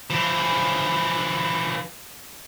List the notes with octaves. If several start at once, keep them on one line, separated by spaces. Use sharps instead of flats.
E3 F3